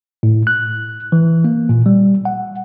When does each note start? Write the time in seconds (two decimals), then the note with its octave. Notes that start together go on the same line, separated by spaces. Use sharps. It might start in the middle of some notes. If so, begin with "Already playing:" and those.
0.23 A2
0.47 F#6
1.12 E3
1.44 A#3
1.69 A#2
1.86 G3
2.25 F#5